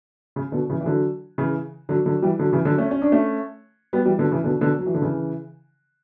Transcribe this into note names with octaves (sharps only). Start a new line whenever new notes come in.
C#3
B2 D3
C#3 E3
E3
D3 F#3
C#3 E3
D3 F#3
D3 F#3
E3 G3
D3 F#3
C#3 E3
D3 F#3
A3 C#4
C#4
D4
A3 C#4
G3 B3
E3 G3
B2 D3
C#3 E3
B2 D3
B2 D3
F#3
E3
D3
C#3 E3